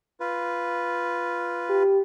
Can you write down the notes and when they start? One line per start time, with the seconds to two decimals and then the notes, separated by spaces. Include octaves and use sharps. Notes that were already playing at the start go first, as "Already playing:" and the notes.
0.20 F4 B4
1.69 G4